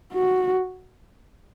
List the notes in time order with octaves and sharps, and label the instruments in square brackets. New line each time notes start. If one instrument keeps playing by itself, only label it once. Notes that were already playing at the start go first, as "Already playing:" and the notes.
[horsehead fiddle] F#4